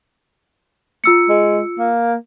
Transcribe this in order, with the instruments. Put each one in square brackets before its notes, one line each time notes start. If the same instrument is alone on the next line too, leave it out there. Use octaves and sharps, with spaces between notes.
[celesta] F4 E6 C#7
[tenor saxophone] G#3
A#3